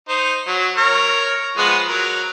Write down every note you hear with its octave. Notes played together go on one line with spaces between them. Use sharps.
D#4 C5
F#3
A#4 C#5
F3 G#3 B3
F#3 A#4